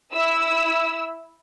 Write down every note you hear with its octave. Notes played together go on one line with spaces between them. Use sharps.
E4 E6